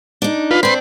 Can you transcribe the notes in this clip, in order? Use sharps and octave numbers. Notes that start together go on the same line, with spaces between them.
D4 D#4
F4 B4
C4 D4 B4 C6